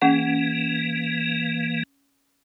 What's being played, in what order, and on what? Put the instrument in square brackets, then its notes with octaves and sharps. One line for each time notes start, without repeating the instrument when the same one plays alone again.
[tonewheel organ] E3 A#3 [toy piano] C#4 G#4 F#5